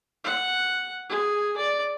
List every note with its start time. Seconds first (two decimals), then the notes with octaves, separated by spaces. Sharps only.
0.24 F#5
1.09 G#4
1.57 D5